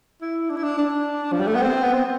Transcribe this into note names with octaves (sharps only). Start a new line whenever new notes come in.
E4
D4
E4
D4
D4
F3
G3
A3
B3
C4
B3
C4